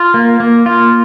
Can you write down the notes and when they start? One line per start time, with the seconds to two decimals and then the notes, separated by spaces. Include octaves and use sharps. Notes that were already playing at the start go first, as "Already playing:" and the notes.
Already playing: F4
0.14 A#3
0.40 A#3
0.66 F4